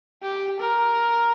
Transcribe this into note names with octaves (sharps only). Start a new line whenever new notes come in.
G4
A#4